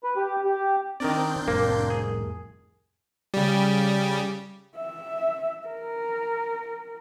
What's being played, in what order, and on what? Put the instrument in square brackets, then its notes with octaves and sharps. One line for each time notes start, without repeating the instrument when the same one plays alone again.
[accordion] B4
G4
G4
[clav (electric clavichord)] D#3 A#4 D5 [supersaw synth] C4 D4 G6
[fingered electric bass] F2 A2 C3 [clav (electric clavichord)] A#3 [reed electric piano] A#4
[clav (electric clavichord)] G#4
[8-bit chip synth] C#3 G3
[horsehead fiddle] E5
A#4